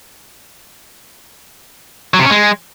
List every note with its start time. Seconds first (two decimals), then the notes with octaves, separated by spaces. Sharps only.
2.14 F#3
2.19 C3
2.25 C#4
2.30 G#3